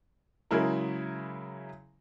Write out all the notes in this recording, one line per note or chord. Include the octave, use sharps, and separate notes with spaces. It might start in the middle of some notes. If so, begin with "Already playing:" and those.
C#3 F#3 G#3 E4 A#4